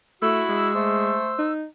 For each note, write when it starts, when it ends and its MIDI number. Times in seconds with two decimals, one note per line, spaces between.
0.22 0.44 57
0.22 0.69 64
0.22 0.73 66
0.22 1.52 88
0.49 1.19 56
0.75 1.37 57
0.75 1.52 72
1.38 1.64 63